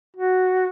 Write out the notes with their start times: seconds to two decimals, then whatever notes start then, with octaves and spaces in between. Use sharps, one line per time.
0.16 F#4